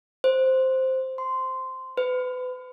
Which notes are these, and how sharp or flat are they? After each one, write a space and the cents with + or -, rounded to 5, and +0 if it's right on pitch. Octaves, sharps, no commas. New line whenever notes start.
C5 +0
C6 -10
B4 +35